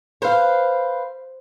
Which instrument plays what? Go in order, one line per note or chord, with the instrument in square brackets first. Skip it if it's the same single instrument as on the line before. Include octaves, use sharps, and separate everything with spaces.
[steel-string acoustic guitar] B4 F5 [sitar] C5